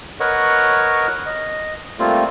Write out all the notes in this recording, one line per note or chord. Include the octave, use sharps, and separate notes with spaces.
A#4 B4 C#5 D#5 F#5 C#6
D#5
G3 A3 A#3 C4 F4